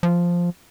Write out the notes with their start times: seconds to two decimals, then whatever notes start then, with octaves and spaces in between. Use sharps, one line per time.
0.03 F3